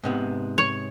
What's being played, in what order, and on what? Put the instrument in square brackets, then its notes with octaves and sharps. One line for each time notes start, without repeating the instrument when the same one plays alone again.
[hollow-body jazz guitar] G#2 C3 B3
[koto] C#5